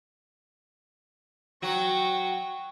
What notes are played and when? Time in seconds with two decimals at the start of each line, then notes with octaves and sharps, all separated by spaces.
1.62 F#3 F#4 G5 C#6